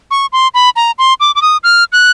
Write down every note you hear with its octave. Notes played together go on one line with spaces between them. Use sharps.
C#6
C6
B5
A#5
C6
D6
D6
D#6
F6
F#6